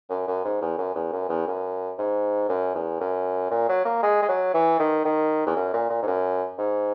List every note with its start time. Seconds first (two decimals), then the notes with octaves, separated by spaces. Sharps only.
0.09 F#2
0.27 F#2
0.45 G#2
0.61 E2
0.78 F#2
0.95 E2
1.12 F#2
1.29 E2
1.47 F#2
1.98 G#2
2.49 F#2
2.75 E2
3.00 F#2
3.51 A#2
3.69 F#3
3.85 A#3
4.03 G#3
4.22 G#3
4.29 F#3
4.54 E3
4.79 D#3
5.05 D#3
5.47 E2
5.56 F#2
5.73 A#2
5.90 A#2
6.02 G#2
6.07 F#2
6.58 G#2